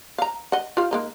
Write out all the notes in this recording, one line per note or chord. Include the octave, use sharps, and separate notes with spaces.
F5 A#5
D#5 F#5
F4 G4 F5
G#3 A#3 D#4